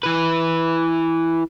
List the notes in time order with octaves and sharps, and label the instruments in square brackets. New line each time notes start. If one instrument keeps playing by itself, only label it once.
[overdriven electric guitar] E3 B4